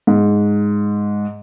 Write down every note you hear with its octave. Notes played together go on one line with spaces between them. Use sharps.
G#2